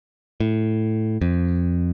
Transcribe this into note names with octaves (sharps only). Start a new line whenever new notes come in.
A2
F2